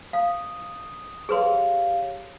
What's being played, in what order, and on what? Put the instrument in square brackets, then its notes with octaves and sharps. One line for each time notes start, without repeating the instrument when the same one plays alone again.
[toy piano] F5 [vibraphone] D#6
[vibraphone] G4 C#5 F5 [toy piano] G#4 B4 C6